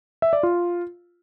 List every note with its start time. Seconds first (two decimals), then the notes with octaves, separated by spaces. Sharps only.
0.22 E5
0.33 D5
0.43 F4